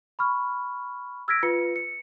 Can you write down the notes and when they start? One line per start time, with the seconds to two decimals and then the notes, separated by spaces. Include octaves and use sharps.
0.19 B5 C#6 F6
1.28 E6 F6 G#6 A#6 B6 D7
1.43 F4 B4 C#7
1.76 C#7